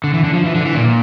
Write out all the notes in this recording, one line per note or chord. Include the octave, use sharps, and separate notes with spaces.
D3
E3
D3
F3
E3
D3
E3
A#2